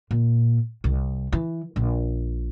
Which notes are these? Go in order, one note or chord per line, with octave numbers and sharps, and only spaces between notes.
A#2
C2
E3
A#1